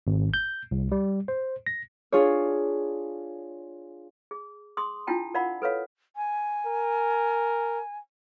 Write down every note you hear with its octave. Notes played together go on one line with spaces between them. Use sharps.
G#1
G6
C2
G3
C5
A#6
D4 F4 G#4 C#5
G#4
G#4 C6 D#6
D4 E4 F4 G5 A5
A#4 D5 F5 F#5 B5
A4 B4 C#5 F5
G#5
A#4